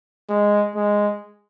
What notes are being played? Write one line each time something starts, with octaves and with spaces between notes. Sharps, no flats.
G#3
G#3